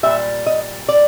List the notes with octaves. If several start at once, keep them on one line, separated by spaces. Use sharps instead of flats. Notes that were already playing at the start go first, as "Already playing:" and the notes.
A#2 G3 E5
D#5
D5